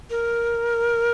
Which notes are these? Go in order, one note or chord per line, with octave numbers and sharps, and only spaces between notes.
A#4